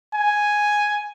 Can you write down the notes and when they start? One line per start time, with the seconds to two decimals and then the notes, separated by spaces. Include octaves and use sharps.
0.15 G#5